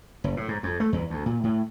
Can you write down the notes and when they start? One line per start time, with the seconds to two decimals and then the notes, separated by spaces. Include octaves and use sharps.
0.24 F#1
0.37 A2
0.48 G#2
0.63 F2
0.80 A3
0.93 E2
1.10 D2
1.26 A#2
1.43 A2